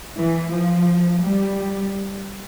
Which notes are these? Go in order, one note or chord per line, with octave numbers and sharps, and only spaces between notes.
E3
F3
G3